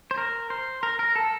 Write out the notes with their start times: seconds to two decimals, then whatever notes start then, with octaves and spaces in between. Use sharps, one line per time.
0.11 C5
0.18 A#4
0.50 C5
0.83 A#4
0.99 A#4
1.16 A4